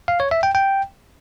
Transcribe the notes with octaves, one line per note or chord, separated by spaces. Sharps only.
F5
C#5
E5
G5
G5